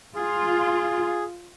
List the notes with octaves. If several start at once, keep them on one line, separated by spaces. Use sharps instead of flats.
F4 G#4